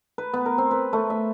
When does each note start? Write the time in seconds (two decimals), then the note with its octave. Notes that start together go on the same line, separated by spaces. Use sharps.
0.18 B4
0.34 B3
0.46 A#4
0.58 C4
0.71 B4
0.93 A3
1.10 E5